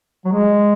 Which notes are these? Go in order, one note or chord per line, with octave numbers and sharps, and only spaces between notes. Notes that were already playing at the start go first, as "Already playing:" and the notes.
F#3
G#3